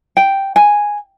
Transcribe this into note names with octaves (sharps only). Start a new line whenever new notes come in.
G5
G#5